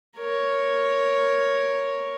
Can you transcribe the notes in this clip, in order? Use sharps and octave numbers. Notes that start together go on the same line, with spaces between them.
A#4 C#5